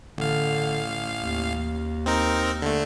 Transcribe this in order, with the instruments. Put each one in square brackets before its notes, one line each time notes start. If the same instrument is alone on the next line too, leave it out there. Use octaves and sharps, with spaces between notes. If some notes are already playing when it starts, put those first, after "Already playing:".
[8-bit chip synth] A1 F5 [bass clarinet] D3
[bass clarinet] D#2
[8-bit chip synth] C4 D#4 A#4
D3 A3